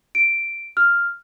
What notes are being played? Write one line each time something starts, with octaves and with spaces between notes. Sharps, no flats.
D7
F6